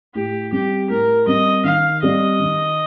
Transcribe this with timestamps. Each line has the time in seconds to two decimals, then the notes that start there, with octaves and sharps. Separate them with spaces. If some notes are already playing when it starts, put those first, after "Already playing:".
0.14 A2 G4
0.52 G3 C4 G4
0.89 A2 A#4
1.27 G3 C4 D#5
1.64 D#3 F5
2.02 G3 C4 G4 D5 D#5
2.39 D#3